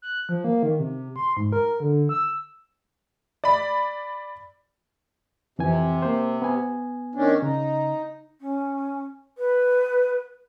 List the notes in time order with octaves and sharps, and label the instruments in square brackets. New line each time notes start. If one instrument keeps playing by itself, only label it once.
[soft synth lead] F#6
F3
A#3
D#3
C3
C6
G#2
A#4
D3
E6
[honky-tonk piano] D5 B5
[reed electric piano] F2 E3 G#5 [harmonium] C3
[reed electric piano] A#3 C5
B3 G#5
[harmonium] D#3 C#4 D4
[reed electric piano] C#3 [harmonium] D#4
[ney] C#4
B4